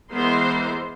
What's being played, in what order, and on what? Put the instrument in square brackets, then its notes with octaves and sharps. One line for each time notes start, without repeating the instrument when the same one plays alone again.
[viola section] E3 G#3 B3 A#4 C5 C6